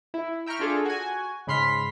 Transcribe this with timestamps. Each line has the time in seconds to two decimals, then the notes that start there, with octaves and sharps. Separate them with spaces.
0.14 E4
0.46 E5 G5 A#5 C#6 F6
0.59 D4 F4 G#4 A4
0.85 F#4 G#5
1.47 G#2 C#3 B5 C6 F6 B6